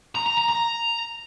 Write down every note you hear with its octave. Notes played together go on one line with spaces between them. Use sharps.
A#5
A#5
A#5
A#5